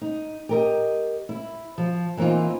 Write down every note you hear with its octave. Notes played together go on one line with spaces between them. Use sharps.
D#4
G4 A#4 D#5
E4
F3
E3 A#3 C4 D#4 F4